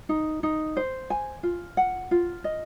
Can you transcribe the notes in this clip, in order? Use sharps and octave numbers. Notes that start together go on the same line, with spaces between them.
D#4
D#4
C5
G#5
F4
F#5
F4
D#5